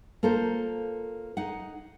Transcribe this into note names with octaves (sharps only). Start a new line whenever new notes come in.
A#3 F4 A4 A#4 C5
D#4 G#4 F#5